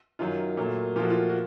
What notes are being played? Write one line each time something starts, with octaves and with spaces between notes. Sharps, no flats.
F#2 D#3 F#3 F4
A#2 F#3 A3
A#2 F3 A3 F4
F#4
F4
F#4